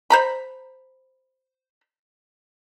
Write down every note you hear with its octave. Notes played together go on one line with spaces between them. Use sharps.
C5 A#5 B5